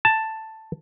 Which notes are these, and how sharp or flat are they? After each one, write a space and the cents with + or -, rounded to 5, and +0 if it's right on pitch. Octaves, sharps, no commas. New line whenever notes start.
A5 +5